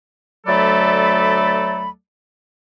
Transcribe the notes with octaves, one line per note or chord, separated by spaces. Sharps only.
D2 F#3 A3 A4 D5 B5